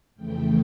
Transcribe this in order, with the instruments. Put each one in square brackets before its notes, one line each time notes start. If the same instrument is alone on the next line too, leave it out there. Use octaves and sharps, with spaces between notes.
[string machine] F2 C#3 E3 A3 G5